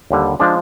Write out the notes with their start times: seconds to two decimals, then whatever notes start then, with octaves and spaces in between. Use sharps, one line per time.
0.11 D#2 D3 G3
0.40 F3 G#3 D4